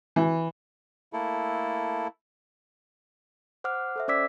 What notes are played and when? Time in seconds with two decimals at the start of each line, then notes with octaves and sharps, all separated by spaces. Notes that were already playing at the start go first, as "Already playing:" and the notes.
0.16 E3
1.13 A3 A#3 E4 A4
3.64 C5 F#5 D6 F6
3.96 A4 C5 E5
4.08 C#4 C5 D5 D6 E6 B6